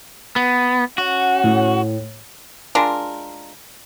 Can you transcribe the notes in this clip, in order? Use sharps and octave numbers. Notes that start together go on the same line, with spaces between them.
B3
C#4 F#4 F#5
A2
G#3 D4 F4 A#4